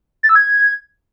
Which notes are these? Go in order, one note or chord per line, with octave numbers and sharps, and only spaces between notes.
A6
E6
G#6